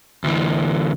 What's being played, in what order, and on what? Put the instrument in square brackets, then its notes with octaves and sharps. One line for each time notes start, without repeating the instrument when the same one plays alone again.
[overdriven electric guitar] D2 E3